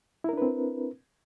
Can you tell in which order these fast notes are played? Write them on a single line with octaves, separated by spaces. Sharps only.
E4 A#4 D4 B4 C4